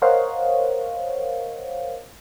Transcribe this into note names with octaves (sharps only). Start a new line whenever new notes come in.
A#4 C5 C#5 D#5 F5 F#5